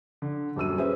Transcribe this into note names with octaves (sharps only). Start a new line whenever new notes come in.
D3
D#1 F#2 E6 D#7
C#4 G#4 B4 C5 E5